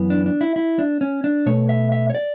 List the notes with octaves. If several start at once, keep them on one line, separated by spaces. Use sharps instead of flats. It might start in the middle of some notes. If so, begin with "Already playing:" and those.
Already playing: F#2 E3 B3
D4
D4
E4
E4
D4
C#4
D4
B2 A3 C#5
E5
E5
C#5
D5